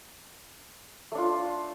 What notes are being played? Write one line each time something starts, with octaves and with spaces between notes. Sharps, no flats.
A3 D4 F4